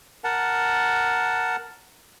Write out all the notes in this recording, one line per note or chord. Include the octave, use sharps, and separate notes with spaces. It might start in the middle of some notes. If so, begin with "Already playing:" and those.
A#4 F#5 A5